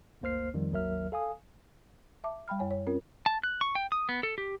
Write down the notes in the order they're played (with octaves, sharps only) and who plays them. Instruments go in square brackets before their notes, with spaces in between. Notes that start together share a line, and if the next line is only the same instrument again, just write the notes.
[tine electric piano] G1 D2 A#3 C5 F6 C7
F2 D#3 F3 G3
G#1 D#2 F#3 A#4 E5 F6
A4 F5 G#5 D#6
[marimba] E5 A5 D6
G3 G5 B5 F6
F#2 C#5 G#5
C#5
C4 C#4 F4 A#4
[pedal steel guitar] A5
F#6
C#6
G5
D#6
B3
A4
G4